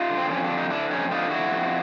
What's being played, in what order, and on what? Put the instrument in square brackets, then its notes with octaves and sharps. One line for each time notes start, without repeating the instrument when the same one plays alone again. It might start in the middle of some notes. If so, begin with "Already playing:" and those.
Already playing: [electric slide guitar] D#4 F4
D3
C4
F2 C#4
D4
D3
D#4
D3 D4 E4
F2 C#4 D#4
D3 D#4 F4
F2 E4 F#4
F2